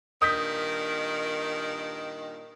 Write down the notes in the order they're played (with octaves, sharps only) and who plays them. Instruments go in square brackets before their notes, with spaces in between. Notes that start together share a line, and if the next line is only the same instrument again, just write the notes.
[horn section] G2 A#2 D#3 [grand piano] D#6 G6 B6